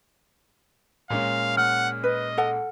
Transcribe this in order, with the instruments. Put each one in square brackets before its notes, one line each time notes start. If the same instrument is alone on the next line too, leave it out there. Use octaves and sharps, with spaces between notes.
[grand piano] A#2 G#3 C#4 [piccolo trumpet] F5
[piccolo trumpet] F#5 [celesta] F6
[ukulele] B4 [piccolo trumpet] D#5
[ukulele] A4 F#5